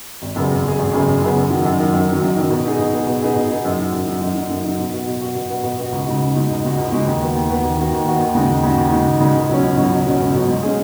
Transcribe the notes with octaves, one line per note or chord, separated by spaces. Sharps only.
G#1
F#2 C#3 B3 G#4
G#1
F#2 C#3 B3 G#4
G#1
F#2 C#3 B3 G#4
G#1
F#2 C#3 B3 G#4
F#2
D#3 F#3
F#2
D#3 F#3
F#2
D#3 F#3
F#2
D#3 F#3
B2
B3 D#4 G#4
B2
B3 D#4 G#4
B2
B3 D#4 G#4
B2
B3 D#4 G#4
F#2
F#3 D#4
F#2
F#3 D#4
F#2
F#3 D#4
F#2
F#3 D#4
B2
B3 F#4
B2
B3 F#4
B2
B3 F#4
B2
B3 F#4
C#2
C#3 G#3 D#4 F#4
C#2
C#3 G#3 D#4 F#4
C#2
C#3 G#3 D#4 F#4
C#2
C#3 G#3 D#4 F#4
D#2
D#3 B3 F#4
D#2
D#3 B3 F#4
D#2
D#3 B3 F#4
D#2
D#3 B3 F#4
D#2
C#3 G#3 D#4 F#4
D#2
C#3 G#3 D#4 F#4
D#2
C#3 G#3 D#4 F#4
D#2
C#3 G#3 D#4 F#4
C#2
B2 F#3 C#4
C#2
B2 F#3 C#4
C#2
B2 F#3 C#4
C#2
B2 F#3 C#4
G#2
G#3 C#4 G#4